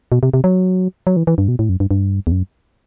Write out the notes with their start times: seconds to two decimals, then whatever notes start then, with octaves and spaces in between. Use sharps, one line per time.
0.12 B2
0.23 C3
0.34 C3
0.44 F#3
1.07 F#3
1.17 E3
1.27 E3
1.38 G2
1.48 B2
1.59 A2
1.69 F#2
1.80 G2
1.91 G2
2.27 E2
2.32 F#2